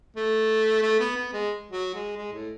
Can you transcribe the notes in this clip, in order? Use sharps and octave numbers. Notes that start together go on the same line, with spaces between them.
A3
A3
B3
B3
G#3
F#3
G#3
G#3
A2